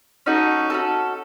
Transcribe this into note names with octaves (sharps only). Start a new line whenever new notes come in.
C#4 D#4 F#4 A4
C#4 F#4 A4